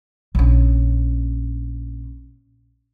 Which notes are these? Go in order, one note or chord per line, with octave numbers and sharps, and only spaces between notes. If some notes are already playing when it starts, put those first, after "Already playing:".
A#1 C#4